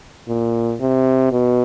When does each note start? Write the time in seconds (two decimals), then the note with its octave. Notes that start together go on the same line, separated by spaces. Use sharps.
0.28 A#2
0.80 C3
1.32 B2